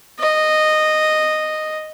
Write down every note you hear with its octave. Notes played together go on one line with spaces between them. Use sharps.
D#5